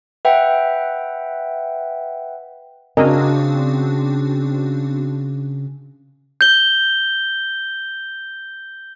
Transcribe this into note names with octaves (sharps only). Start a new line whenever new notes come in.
B4 E5 F#5 G5
C#3 C4 D4 F#4 A#4 D#5 G#5
G6 G7